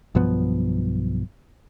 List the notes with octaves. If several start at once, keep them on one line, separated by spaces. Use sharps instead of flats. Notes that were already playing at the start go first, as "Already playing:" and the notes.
B1 G2 F3 B3